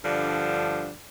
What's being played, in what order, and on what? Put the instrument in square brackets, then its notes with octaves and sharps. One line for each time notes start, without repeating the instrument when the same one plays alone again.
[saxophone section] G2 D3 F3 D4